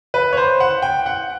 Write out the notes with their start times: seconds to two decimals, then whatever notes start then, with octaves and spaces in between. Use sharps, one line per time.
0.14 B4
0.33 C#5
0.37 C5
0.60 F#5
0.82 G5
1.06 F#5